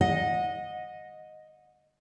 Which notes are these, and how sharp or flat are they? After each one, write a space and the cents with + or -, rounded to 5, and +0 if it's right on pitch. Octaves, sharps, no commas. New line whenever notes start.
D#5 +0 F#5 -30